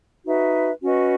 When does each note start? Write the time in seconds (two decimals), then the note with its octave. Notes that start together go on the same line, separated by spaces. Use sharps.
0.25 D#4 F#4 B4 E5
0.82 C#4 F#4 B4 D#5